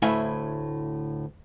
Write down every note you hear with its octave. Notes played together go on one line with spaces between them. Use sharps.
D2 A2 E4 E5 F5 G#5